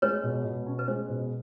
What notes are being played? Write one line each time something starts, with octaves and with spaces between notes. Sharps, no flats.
G#3 B4 C#5
B2
B2
C#4
B4
G#3 C5
B2